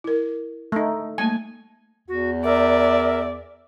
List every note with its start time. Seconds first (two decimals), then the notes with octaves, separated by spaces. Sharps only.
0.04 E4 A#4
0.72 A3 D#4
1.18 G3 A3 A#3 G#5
2.08 E2 F#4
2.44 A#4 D5 E5